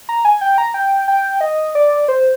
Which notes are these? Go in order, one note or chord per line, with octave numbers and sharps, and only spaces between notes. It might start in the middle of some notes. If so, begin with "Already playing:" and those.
A#5
G#5
G5
A#5
G5
G5
D#5
D5
C5